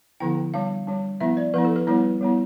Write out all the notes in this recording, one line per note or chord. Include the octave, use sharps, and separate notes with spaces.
D3 F3 B3 E4 G5
G3 D4 F5
G3 D4
F3 B3 E4 E5
D5
F3 B3 E4 B4
A4
B4
G3 B3 E4 B4
G3 B3 E4